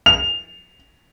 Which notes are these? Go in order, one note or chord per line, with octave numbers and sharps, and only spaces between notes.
F7